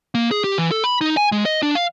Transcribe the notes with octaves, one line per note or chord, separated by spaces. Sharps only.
A#3
G#4
G4
E3
A4
B5
D#4
G#5
G#3
D#5
D4
F5